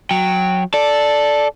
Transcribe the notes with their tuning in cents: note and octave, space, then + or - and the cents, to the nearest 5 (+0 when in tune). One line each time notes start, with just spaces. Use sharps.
F#3 -10 G5 +0
A4 -5 D5 +0